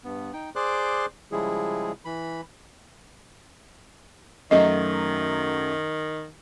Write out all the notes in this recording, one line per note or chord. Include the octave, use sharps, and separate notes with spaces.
G2 B3
D#4 G5
G#4 C5 D5 C6 D6 F#6
C#3 F3 G3 G#3 E4 G#4
E3 B5
F#2 D#3 F#3 A3 D#5